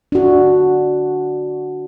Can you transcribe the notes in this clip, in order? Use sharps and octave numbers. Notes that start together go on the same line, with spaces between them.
D4 F#4